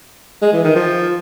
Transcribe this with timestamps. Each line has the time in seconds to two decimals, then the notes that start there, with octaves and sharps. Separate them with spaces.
0.42 G#3
0.53 E3
0.64 D#3
0.75 F3